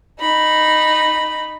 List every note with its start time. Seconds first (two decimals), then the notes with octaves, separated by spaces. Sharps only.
0.19 D#4 B5